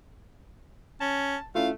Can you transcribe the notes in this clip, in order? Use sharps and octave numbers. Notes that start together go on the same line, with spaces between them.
C#4 A5
A3 C#4 E4 F4 F5